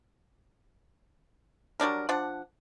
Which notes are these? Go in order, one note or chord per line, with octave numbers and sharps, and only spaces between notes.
F#3 G3 D4 A#4
F3 D4 F#5